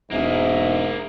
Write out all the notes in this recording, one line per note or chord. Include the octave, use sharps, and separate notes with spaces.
E1 G#2 A#3 G#4 E5